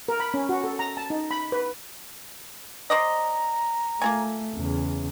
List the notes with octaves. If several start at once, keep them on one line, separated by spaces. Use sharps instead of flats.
A#4
B5
C#4
F#4
A4
A#5
A5
D#4
B5
B4
C5 D5 D#5 A#5
A3 A#3 F4 G#5
E2 C#3